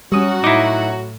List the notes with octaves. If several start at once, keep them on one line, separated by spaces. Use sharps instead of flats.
F#3 G3 C#4 F#4 D#6
A2 D#4 E4 D6